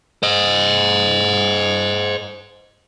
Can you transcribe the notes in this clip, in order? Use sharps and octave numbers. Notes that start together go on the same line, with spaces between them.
C5 D#5